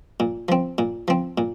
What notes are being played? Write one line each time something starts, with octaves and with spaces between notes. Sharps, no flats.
A#2
F3 C4
A#2
F3 C4
A#2